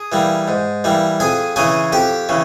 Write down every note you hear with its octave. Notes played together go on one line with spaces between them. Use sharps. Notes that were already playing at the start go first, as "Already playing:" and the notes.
Already playing: G#4
E3 G3 A#3
G#2
E3 G3 A#3
F2 G#4 G#5
C#3 E3 G#4 G#5
F2 G4 G5
C#3 E3